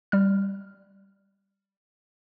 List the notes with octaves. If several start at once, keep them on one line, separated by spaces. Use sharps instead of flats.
G3 F6